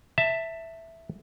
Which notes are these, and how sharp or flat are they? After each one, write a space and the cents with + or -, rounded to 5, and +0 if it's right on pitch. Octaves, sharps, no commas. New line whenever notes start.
E5 +0 A5 +20